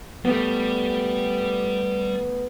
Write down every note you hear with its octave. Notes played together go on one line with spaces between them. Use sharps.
G3 A3 B3